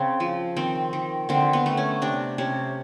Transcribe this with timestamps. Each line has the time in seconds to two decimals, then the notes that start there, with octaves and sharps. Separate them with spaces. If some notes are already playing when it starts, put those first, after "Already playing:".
Already playing: C#3 C4
0.20 F3
0.56 D#3 C4
0.93 D#3
1.29 D3 C4
1.53 B3
1.66 A3
1.77 C#4
2.02 C3 D4
2.38 C3 C#4